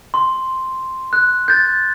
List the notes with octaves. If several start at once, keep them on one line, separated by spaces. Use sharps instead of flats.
C6
F#6
G6 A6